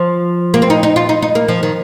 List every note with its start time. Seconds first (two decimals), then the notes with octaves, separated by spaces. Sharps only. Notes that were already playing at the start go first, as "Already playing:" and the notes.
Already playing: F3
0.54 A#3
0.62 C4
0.70 D#4
0.83 D#4
0.96 F4
1.09 D#4
1.22 D#4
1.35 A#3
1.48 F3
1.63 D#3